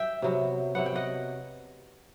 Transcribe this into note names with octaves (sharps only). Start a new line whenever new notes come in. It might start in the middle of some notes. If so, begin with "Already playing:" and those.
Already playing: E5 G5
C3 F#3 B3
C3 F#3 B3 F#5
G5
D#5 F#5